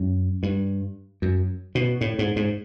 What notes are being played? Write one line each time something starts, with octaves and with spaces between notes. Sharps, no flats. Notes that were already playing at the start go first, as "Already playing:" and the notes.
Already playing: F#2
G2
F#2
B2
A2
G#2
G#2